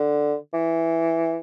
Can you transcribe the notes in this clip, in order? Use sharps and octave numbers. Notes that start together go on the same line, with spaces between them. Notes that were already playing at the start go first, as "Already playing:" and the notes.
Already playing: D3
E3